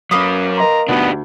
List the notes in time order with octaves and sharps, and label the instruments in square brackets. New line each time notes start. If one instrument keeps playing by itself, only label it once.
[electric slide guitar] F#3 C#4 [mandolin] A#3 B4 D#6
[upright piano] A#4 D#5 C6 [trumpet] A#5
[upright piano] D2 [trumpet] B3 [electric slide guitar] D4 D#4 G4